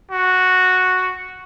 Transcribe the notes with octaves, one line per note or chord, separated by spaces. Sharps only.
F#4